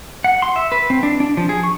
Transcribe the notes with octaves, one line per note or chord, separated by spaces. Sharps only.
F#5
C6
E5
B4
C4
D4
D4
F3
G#4
C#6